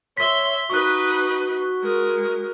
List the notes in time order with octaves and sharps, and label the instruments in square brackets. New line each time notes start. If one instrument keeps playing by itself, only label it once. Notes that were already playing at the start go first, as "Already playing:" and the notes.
[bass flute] C#5 [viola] E5 C6 [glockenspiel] B6 G7
[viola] D#4 B4 [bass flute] F#4 [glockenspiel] C#6 F#6
[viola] G#3 A#4